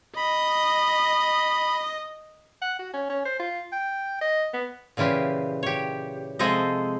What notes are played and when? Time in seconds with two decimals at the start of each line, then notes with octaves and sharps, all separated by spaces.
0.17 D#5 B5
2.62 F#5
2.79 F#4
2.94 C#4
3.09 C#4
3.25 C5
3.40 F4
3.72 G5
4.21 D#5
4.53 B3
4.97 A#2 C#3 E3 F4 G4
5.63 G4 C#5
6.39 C3 F3 G#3 A4 C5 D#5